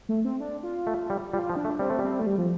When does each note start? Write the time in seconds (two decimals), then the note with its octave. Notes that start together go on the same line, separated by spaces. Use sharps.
0.09 A3
0.25 C4
0.40 D4
0.63 F4
0.87 A3
1.10 G3
1.33 G3 F4
1.50 F3
1.56 D4
1.65 A3
1.79 G3 C4
1.90 A3
1.99 G3 C4
2.20 A3
2.27 G3
2.38 F3